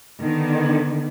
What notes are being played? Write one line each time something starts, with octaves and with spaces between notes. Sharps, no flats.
D3 D#3 B3